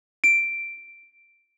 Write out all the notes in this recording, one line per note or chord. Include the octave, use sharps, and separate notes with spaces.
D7